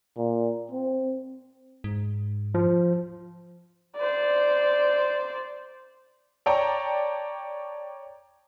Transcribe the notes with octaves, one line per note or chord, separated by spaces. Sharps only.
A#2
C4
G#2
F3
C5 D5
C#5 D5 G5 A5 A#5